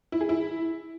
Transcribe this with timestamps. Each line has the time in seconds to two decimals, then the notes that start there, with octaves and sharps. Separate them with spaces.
0.12 E4
0.21 G#4
0.29 E4